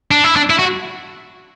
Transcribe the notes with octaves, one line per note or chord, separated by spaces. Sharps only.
D4
E4
D4
E4
F#4